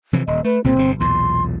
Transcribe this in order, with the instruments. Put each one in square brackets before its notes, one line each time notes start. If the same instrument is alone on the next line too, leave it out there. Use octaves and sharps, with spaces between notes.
[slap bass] C3 E3 F3
[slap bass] D#1 [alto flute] D#5
[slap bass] A3 [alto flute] B4
[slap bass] C2 A#2 C#3 [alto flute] C4
[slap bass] G1 C3
[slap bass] B1 E2 A#2 [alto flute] C6